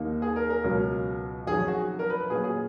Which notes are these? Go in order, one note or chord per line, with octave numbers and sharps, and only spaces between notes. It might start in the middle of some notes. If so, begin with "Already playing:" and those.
Already playing: D#2 D#3 A#3 D#4
G#4
A#4
A#4
C#2 B2 F#3 C#4
F2 D#3 F#3 C#4 G#4
F#4
A#4
B4
B4
A#2 F#3 C#4 G#4
G#4